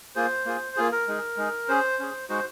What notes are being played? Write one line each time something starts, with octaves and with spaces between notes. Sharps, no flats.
A#3 F4 G#4 C5
A#3 F4 G#4
A#3 F4 G#4
A#4
G#3 D#4 G#4
G#3 D#4 G#4
C#4 G#4 C5
C#4 G#4
G#3 D#4 F#4 C5